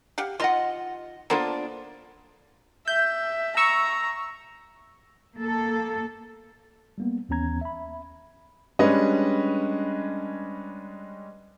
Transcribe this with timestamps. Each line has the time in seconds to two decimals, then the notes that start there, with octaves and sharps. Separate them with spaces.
0.18 G4 F5 F#5
0.40 D#3 F4 D#5 F#5 C6
1.30 A#3 B3 D4 F4 A4 C5
2.88 E5 G6
3.57 A#5 C#6 E6
5.35 A#3 A4
6.98 G3 A#3 B3
7.29 D#2 E3 B3 C#4 A#5 G#6
7.61 E5 B5
8.79 G3 G#3 C#4 D4 B4 D#5